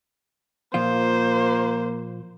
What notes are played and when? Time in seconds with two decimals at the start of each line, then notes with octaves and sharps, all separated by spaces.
0.74 A#2 F3 A#3 F4 C5